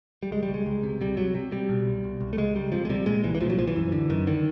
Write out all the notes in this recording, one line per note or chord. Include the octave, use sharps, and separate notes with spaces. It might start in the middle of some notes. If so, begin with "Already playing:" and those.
G3
C#2 G#3
G3
C#2
G#3
C#2
C3
C3 G3
C3 F#3
C3
C3 G3
B2
C2
C2
C2
A3
C#2 G#3
C#2 G3
C3 F3
G#3
C3 G3
A#2 G#3
C2 E3
E3
A#2 F3
F#3
C2 F3
E3
F#2
D3
F#2 D#3
D3 D#3